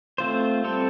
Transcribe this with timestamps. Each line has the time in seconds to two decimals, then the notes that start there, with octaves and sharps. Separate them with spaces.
0.18 A3 C4 F4 C5
0.64 G3 C4 A4 C5